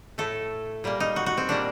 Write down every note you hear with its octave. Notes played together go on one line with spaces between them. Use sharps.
A2 A3 A4
A#2 G3 A#3
D#4
F#4
F#4
C4
A#2 G3 A#3 D4